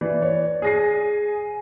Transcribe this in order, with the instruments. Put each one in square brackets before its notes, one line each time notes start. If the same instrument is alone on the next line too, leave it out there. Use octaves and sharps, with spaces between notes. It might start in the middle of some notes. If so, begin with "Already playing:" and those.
[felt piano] E3 [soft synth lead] D5
[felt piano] C#5
[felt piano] G#4 A#6 C7 [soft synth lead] G#5